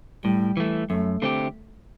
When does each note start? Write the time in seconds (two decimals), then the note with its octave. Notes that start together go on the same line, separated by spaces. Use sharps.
0.24 A2 G3
0.57 E3 A3
0.90 F#2 A3
1.22 D3 A3 C4 G4